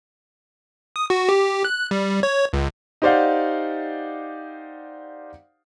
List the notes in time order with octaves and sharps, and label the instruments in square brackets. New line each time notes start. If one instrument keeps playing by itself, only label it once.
[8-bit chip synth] D#6
F#4
G4
F#6
G3
C#5
C#2
[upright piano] D#4 G4 C5 D5 F5 F#5